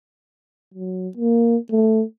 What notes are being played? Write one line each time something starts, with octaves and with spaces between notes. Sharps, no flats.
F#3
A#3
A3